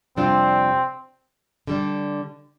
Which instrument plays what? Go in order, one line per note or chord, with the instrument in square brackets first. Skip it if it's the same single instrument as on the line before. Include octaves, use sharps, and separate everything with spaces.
[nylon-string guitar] F2 C3 G3 D4 F4 [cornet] C4
[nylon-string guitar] D3 G3 D4